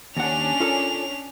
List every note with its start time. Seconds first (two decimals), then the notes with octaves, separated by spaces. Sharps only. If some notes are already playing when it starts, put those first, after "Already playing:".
0.17 D#2 C#4 D4 F#5 F7
0.60 F4 A4 A#4